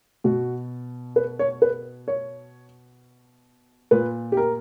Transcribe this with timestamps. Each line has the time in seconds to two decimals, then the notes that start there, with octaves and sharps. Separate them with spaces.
0.24 B2 F#4
1.16 B4
1.39 C#5
1.62 B4
2.08 C#5
3.91 A#2 B4
4.32 G4
4.37 A#4